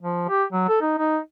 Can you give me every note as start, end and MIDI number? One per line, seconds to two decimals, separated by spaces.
0.01 0.28 53
0.29 0.44 67
0.52 0.65 54
0.68 0.79 69
0.81 0.95 63
0.99 1.18 63